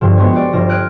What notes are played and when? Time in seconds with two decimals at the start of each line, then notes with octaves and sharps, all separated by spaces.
0.01 G2 D3 F3
0.17 F3 G#3 B3 C4 F#4 C#5
0.33 F#4 C5 D5
0.53 G1 F3 A#6
0.69 D#6 F6 F#6 G#6 D7